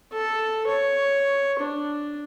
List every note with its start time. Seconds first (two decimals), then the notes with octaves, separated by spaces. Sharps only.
0.13 A4
0.67 C#5
1.60 D4